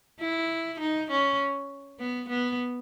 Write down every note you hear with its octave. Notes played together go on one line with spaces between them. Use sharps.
E4
D#4
C#4
B3
B3